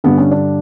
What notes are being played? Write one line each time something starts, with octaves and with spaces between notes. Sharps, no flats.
G2 D3 B3
C#4
D4